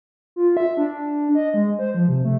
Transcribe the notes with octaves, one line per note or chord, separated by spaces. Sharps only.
F4
E5
D4
D#5
G#3
C5
F3
C3
A3